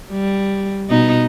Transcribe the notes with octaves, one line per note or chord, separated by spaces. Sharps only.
G3
B2 B3 D#4